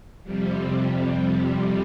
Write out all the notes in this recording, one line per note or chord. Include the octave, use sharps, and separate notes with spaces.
F2 C3 G3